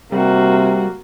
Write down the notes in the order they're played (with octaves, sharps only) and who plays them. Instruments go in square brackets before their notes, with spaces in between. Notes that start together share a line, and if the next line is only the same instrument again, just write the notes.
[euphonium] C3 [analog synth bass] G3 [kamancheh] A#3 F#4